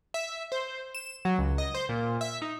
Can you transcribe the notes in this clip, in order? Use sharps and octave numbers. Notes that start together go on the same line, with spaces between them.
E5
C5
E7
F#3
C#2
D#5
C5
A#2
E5
D#4